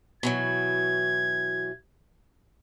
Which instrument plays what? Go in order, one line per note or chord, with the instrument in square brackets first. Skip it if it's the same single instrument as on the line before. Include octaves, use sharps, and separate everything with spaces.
[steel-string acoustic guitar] B2 E3 F#3 [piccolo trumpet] G#6